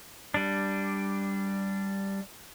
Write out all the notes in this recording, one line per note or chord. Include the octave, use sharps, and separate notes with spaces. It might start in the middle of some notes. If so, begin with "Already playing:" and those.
G3 D4